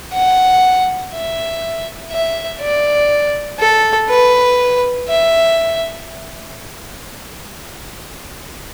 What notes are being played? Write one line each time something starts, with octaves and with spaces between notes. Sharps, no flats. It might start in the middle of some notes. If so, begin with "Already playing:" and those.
F#5
E5
E5
D5
A4
B4
E5